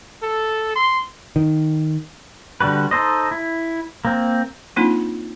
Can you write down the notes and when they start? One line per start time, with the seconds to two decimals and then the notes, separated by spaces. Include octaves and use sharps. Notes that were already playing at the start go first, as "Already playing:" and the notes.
0.22 A4
0.76 C6
1.36 D#3
2.61 D3 G3 F#4 B4
2.91 D#4 A4 C5 D#5
3.31 E4
4.05 A#3 C4
4.76 F#3 A#3 C4 D4 D#4 F4